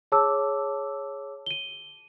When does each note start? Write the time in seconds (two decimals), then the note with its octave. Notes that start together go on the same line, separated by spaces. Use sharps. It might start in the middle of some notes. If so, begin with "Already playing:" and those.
0.12 G#4 C#5 A5 D6 E6
1.46 D#7 G7